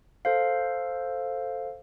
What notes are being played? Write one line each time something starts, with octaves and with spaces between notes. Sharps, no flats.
A4 C5 F5